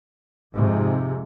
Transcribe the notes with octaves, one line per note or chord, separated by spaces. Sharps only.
F2 G#2 C3